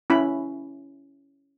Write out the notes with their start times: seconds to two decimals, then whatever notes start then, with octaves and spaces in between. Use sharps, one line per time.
0.10 C#4 E4 B5